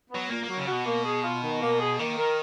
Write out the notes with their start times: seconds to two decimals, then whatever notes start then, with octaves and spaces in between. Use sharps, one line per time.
0.10 F#3 B3
0.29 A#2 A#3
0.44 F#3 A#3
0.57 C#3
0.67 B2 F#4
0.85 A#3
1.04 G#4
1.23 F4
1.42 D#3
1.61 A#3
1.80 G#4
1.98 D#3 A#3
2.17 A#4